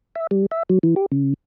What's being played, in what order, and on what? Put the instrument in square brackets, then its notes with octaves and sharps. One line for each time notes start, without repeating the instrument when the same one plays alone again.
[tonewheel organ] E5
G3
E5
F#3
E3
G4
C#3